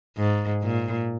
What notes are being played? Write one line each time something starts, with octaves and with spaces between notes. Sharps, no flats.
G#2
A#2